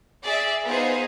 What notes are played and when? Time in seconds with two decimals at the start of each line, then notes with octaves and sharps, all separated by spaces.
0.22 G#4 D5 E5
0.65 B3 D#4 F4 G#4 C5